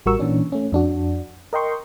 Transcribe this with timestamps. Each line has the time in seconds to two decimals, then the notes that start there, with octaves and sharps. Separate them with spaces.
0.06 A1 G3 F#4 A#4 C#6 E6
0.19 A#2 E3 C#4 D4
0.52 A3 C#4
0.72 F2 D4 F#4
1.53 A#4 D#5 G5 C6 C#6